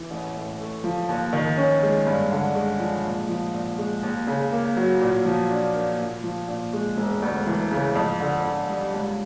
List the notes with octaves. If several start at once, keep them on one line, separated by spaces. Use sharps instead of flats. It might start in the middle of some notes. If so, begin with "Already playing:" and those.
Already playing: E3
A1
A2
A3
F3
D#2
D#3
C#4
G#3
G2
D3
G#3
F3
A#2
F3
A#2
G#3
D#2
C#3
A#3
F#3
A#2
F3
D4
A#3
A#2
F3
A#2
G#3
E1
D2
E3
C#3
F2
D3
F2
G3
C#2